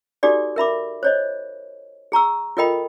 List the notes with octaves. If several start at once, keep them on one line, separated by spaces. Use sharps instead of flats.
D#4 F#4 G4 A4 D5 D6
A#4 E5 B5 D6
C5 C#5 D#5
G#4 A#5 C#6 E6
F4 A4 A#4 D#5 G5 B5